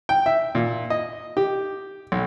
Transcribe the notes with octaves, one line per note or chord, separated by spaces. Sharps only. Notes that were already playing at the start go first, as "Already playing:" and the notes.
G5
E5
A#2
D#5
G4
B1